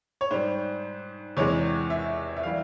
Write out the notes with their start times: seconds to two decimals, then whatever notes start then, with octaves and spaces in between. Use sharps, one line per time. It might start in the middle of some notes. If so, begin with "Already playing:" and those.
0.21 C#5
0.31 G#2 G3 C5
1.37 E2 C3 E3 G#3 C#5
1.90 E5
2.37 E5
2.43 E3 G3 F5